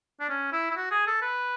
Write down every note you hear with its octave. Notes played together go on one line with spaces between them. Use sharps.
D4
C#4
E4
E4
F#4
G#4
A4
B4